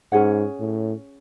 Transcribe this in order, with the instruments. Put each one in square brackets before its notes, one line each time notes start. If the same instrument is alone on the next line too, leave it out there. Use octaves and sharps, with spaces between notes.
[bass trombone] G#2 [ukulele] C#4 G#4 C#5 F#5
[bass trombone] A2